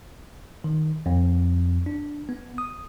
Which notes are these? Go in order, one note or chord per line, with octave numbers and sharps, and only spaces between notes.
D#3
F2
D4
B3
D#6